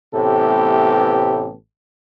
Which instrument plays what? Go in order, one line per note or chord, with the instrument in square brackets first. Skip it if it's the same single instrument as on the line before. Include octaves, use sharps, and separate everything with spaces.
[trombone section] A1 A2 C3 B3 G4 A4